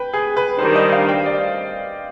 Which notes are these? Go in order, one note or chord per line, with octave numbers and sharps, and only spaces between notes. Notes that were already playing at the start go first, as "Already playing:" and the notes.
Already playing: B4 G5
G#4
B4
D#3 G3 D4 C5
D#5
F5
G5
D5